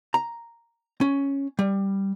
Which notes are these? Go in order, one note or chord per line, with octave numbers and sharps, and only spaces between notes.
A#5
C#4
G3